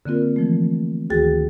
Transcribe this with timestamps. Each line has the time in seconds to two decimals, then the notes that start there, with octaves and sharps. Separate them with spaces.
0.06 D3 A#3 C4 F4 A#4
0.36 E3 F3 A3
1.10 D2 D#3 F#4 G#4 G5 A6